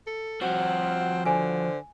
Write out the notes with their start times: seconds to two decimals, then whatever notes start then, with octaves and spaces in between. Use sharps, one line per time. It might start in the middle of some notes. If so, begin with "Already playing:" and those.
0.07 A4
0.41 F3 C4 F#4 F#5
1.26 D3 C5 G#5